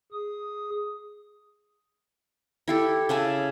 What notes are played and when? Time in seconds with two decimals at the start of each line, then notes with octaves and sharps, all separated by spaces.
0.12 G#4 D#6
2.68 E4 G4 A4
3.09 C#3 E5 G#5 A5